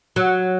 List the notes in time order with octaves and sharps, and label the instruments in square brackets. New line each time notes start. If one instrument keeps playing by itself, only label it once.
[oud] F#3